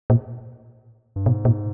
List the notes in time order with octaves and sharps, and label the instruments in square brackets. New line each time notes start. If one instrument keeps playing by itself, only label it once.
[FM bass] A#2
[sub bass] G2
[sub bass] G#2 [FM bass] B2
[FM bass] A#2